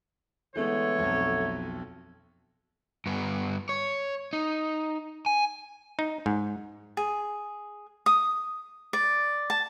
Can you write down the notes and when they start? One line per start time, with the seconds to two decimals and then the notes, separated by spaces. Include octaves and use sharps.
0.56 D3 E3 G#3 A3 B3 C#5
0.99 B1 F2
3.06 G2 B3
3.69 C#5
4.33 D#4
5.26 G#5
5.99 D#4
6.26 G#2
6.97 G#4
8.06 D#6
8.93 D5
9.50 A5